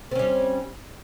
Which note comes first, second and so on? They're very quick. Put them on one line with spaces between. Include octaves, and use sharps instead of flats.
C4 C#4 G3